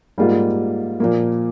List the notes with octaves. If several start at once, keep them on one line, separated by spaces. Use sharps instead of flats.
G#2 G3 A#3 F4
A#2 F3 A#3